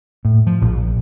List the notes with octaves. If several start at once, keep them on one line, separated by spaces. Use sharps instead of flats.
A2
F3
A#1